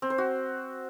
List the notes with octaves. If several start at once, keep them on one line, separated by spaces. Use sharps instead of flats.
C4
C5
F#4